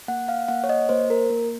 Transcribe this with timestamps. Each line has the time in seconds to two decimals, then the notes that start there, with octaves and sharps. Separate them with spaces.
0.08 A#3 F#5
0.28 F5
0.48 A#3 F#5
0.64 C#5
0.69 D#5
0.89 A#3 C5
1.10 A#4
1.30 A#3